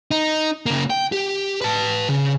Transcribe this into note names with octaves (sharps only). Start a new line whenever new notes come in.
D#4
C#3 A#3
G5
G4
B4 A5
C#3